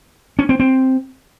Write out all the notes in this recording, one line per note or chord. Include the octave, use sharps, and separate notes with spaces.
C#4
C4
C4